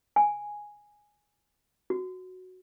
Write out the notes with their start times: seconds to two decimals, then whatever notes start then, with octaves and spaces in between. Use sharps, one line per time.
0.16 G#5
1.90 F#4